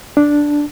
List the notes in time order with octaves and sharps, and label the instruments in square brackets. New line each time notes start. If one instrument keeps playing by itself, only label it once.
[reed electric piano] D4